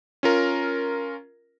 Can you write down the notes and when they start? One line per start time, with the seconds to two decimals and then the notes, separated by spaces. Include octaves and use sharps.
0.23 C#4 F4 A#4